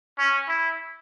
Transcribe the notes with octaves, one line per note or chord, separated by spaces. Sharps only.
C#4
E4